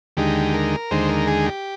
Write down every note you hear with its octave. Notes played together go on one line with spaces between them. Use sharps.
D#2 D3 G#3 D#4 G4
A#4
D#2 D3 G#3 D#4 C5
A#4
G#4
G4